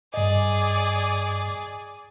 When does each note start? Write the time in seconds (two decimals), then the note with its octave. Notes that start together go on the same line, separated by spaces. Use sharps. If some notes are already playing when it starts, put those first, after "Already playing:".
0.14 G2 G#4 D5 D#5